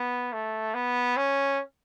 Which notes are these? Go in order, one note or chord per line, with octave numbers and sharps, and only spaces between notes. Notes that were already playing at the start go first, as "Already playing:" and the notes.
Already playing: B3
A3
B3
C#4